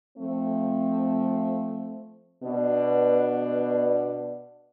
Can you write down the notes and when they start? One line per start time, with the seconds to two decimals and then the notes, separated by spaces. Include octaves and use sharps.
0.17 F3 A3 C4
2.42 B2 B3 D4